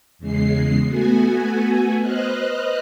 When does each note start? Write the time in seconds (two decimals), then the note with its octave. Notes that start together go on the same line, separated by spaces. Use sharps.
0.19 E2 C#3 G#3 C7
0.87 A3 B3 F#4 G#5
2.00 B4 C5 D#5 F6 F#6